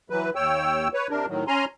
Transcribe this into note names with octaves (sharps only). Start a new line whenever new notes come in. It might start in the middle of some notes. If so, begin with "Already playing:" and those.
E3 F#3 B4
D#2 C#5 G5 E6
B4 C#5
C3 D4 A#4
A2 D#3 F#3
C#4 G#5 A#5 C6